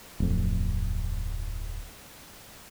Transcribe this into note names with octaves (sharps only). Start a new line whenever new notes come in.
D1 F2